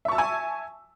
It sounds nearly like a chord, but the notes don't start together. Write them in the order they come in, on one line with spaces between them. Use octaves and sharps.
E5 C#6 A5 E6 G#5